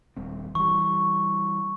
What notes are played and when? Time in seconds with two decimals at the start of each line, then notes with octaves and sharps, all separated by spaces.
0.17 D#1 G3 C4
0.55 E3 G3 C#6